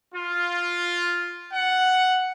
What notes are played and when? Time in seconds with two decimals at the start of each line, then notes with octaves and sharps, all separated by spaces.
0.14 F4
1.53 F#5